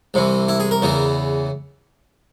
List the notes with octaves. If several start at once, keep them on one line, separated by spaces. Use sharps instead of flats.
C2 C3 E3
E4
G#4
A#4
E2 C#3 E3